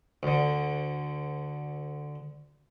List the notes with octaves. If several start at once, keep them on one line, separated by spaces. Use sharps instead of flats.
D2 D3